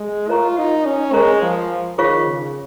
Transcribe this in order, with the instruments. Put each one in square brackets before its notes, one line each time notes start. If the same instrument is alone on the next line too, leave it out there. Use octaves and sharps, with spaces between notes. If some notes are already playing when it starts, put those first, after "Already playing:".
Already playing: [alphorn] G#3
[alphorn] F4 [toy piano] A#4 C#5 A#5 C#6
[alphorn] D#4
C#4
[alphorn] G#3 [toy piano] A#4 C#5 A#5 C#6
[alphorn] F3
[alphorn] D#3 [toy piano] F4 G#4 C#5 F5 C#6
[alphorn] C#3